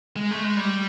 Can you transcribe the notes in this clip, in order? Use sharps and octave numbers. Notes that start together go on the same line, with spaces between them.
G#3
A3
G#3
G3